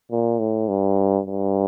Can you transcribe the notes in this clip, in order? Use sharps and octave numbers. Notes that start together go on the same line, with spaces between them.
A#2
A2
G2
G2